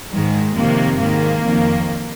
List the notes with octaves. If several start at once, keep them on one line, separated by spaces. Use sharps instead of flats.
G#2 D#3 G#3
F2 C3 D#3 A#3
G#2 D#3 A#3
F2 D#3